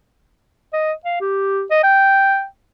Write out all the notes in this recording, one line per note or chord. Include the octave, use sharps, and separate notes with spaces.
D#5
F5
G4
D#5
G5